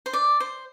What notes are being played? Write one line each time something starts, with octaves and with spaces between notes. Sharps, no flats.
C5
D5
C5